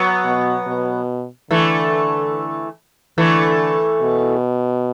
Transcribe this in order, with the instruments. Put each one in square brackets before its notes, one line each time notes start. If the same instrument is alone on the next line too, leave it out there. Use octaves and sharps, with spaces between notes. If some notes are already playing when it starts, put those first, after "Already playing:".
Already playing: [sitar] F#3 B3
[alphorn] B2
B2
[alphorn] D3 [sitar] E3 A3
[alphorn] D3 [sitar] E3 A3
[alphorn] B2